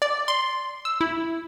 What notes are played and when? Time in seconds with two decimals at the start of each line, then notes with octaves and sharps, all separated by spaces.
0.02 D5
0.28 C6
0.85 E6
1.01 E4